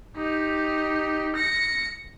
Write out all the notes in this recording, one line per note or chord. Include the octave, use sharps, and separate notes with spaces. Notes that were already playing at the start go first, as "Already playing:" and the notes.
D#4 G4
A#6 C#7